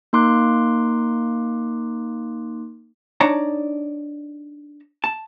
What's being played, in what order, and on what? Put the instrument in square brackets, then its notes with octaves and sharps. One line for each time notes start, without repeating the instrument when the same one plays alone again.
[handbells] A#3 D#4 C6 D6 F#6
[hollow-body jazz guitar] D4 D#4 C#5 D5 A5 A#5
A5